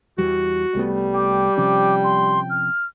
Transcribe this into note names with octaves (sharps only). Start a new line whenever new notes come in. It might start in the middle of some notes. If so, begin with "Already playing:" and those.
E2 E3 G3 F#4
C2 G3 A3 B3
G5 D6
C3 F3 C#4 D6
C6
F6